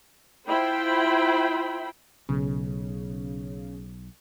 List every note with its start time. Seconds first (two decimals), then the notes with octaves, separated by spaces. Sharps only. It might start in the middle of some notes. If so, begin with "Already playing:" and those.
0.47 E4 F4 C5 G5 B5
2.29 B1 C#3